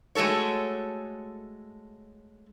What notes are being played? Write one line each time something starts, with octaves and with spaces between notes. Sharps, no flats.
G#3 A3 F#4 A4 C#5